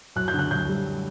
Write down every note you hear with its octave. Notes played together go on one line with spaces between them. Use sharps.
F#2 F#6
G6
D3
F#6
F#2 G6
G3